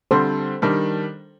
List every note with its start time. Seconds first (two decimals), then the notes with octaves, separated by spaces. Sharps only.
0.11 D3 G3 C4 A4 C5
0.62 D#3 G3 D4